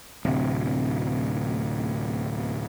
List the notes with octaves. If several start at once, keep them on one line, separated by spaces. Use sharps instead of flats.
D1 C3